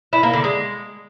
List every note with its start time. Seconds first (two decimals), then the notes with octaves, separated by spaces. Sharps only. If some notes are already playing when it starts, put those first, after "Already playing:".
0.13 E4
0.23 A#3
0.33 D3
0.44 G#3